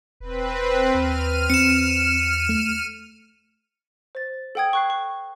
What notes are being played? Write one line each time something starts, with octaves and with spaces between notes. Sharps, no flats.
E1 C4 B4
D#2 F6 D#7
E2 C4 C#7 E7
A3
C5 A6
A4 F#5 G5 D#6 G#6
C#6 F#6 C7
C#6